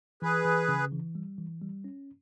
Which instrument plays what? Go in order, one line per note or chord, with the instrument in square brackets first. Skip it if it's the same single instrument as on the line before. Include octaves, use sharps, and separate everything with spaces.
[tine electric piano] E3 [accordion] G#4 B4
[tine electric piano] E3
C#3
E3
G3
E3
G3
C#4